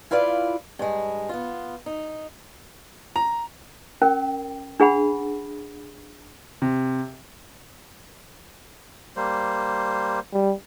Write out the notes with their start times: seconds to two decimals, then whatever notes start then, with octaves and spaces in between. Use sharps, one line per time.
0.11 E4 F4 B4 D5 F5
0.79 G2 G#3
1.29 B3 F4
1.86 D#4
3.16 A#5
4.02 C#4 A#4 G5
4.80 D4 G#4 F#5 B5
6.62 C3
9.16 G3 A#3 C5
10.33 G3